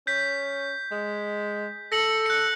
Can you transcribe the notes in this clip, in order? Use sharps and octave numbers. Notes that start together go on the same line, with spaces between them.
C#4 G6 B6
G#3
A4 A#6 C#7 F#7
F#6 C#7